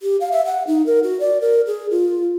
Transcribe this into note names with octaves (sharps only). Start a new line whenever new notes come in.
G4
F5
E5
F#5
D#4
A#4
F#4
D5
A#4
G#4
F4